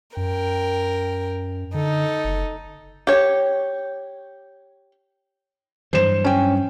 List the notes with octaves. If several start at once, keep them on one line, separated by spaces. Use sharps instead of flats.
F#2 A#4 G5
D3 D#4 A4
F#1
G4 C#5
G2 E3 F#3 C5 E7
C#4 G5